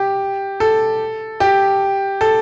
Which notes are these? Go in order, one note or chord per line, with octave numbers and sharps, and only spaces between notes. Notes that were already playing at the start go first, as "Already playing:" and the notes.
Already playing: G4
A4
G4
A4